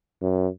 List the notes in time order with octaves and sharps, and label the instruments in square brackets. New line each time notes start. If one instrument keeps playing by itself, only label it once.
[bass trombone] F#2